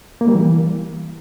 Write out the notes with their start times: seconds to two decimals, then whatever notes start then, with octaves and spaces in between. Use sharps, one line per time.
0.21 A#3
0.28 G3
0.35 E3